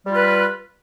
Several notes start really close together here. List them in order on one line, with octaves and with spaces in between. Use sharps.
G3 F4 B4